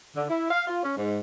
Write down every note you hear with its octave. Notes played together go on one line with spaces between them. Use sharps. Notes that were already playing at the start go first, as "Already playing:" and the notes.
D3
E4
F5
F4
C#4
G#2